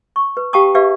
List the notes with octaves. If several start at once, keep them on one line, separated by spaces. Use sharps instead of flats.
C#6
B4
G4 F5 G5 A5 C#6 D#6
G4 G#4 B4 D5 E5 F5